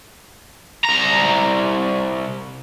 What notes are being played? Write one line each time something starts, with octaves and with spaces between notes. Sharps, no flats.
C2 A#5